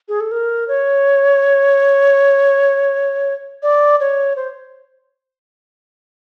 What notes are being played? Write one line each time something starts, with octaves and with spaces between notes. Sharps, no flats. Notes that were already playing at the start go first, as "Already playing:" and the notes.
G#4
A4
A#4
C#5
D5
C#5
C5